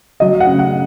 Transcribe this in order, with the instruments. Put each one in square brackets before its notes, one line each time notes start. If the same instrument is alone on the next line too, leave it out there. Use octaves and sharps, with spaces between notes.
[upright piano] F#3 D#5
F#5
C#3
F#5